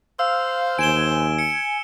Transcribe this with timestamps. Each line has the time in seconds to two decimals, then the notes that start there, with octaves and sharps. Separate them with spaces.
0.19 C5 F5 E6
0.79 D#2 G#5 D7 E7 G7
1.39 C#7